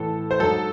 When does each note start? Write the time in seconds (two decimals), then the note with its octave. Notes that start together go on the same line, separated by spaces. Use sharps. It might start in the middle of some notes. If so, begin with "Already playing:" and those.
Already playing: A2 E3 A4
0.31 C5
0.39 G#2 F#3 A4